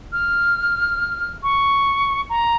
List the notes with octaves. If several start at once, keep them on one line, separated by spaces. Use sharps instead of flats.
F6
C#6
A#5